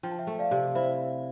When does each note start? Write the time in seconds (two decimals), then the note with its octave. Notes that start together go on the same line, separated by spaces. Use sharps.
0.03 F3 G5
0.12 A5
0.19 E5 G5
0.27 A3
0.39 D5 F5
0.51 C3
0.75 E4 C5 E5